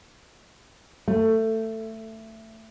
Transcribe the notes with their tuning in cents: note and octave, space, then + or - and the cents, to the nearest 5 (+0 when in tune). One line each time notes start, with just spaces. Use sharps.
A3 +15